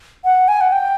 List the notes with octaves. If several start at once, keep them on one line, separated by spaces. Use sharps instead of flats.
F#5
G#5
F#5
G5